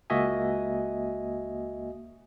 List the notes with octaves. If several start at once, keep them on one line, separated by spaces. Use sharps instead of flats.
C#2 A#3 F#4 D#5 E5 G#5